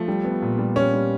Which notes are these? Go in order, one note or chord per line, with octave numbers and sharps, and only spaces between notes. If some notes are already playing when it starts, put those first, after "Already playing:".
Already playing: F3 A3
G3
B3
A#2
G3
G3 C#4
G3